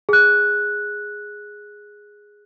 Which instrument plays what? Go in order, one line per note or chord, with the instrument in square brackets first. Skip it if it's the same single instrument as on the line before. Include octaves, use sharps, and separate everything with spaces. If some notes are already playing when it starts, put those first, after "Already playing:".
[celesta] G#4 F#6